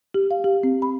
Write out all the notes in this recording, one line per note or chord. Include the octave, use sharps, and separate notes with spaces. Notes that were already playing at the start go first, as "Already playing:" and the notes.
G4
F5
G4
C4
B5